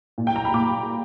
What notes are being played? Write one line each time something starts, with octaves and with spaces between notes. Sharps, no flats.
A#2
G5
A#5
B5
A#2 D6